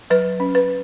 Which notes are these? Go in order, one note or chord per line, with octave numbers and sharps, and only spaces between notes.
F#3 B4
C#4
B4